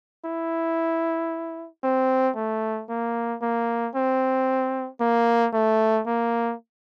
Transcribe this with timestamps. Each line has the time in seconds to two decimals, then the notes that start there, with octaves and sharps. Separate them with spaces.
0.25 E4
1.83 C4
2.36 A3
2.89 A#3
3.42 A#3
3.95 C4
5.01 A#3
5.54 A3
6.06 A#3